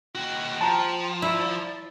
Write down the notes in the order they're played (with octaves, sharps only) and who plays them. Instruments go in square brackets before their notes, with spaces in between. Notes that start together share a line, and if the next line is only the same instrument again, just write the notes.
[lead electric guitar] D#2 F#4 [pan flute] G5
[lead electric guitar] F3 [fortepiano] A5 A#5
[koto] E4 [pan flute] D5